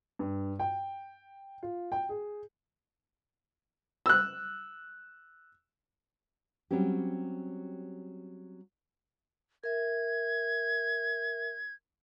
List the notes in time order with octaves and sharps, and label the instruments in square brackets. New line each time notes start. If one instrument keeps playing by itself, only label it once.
[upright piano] G2
G5
F4
G5
G#4
[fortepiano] E6 F#6
[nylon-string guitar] F#3 G3 C4 C#4 G4
[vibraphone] A#4 E5 [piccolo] G#6